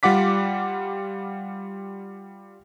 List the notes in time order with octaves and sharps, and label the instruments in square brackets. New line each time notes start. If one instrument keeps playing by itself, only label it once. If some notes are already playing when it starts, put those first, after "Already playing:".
[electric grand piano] G3 F4 F#5 D6 B6